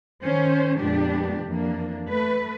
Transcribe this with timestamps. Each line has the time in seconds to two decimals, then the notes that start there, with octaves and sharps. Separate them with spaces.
0.22 D#3 C#4 C5
0.78 F2 A#2 G#3 B3 D4 G4
1.44 F2 E3 F3 A#3 D4
2.09 A3 B4